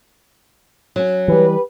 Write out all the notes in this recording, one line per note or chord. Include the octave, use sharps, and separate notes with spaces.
F#3 C#4
E3 G3 G4 B4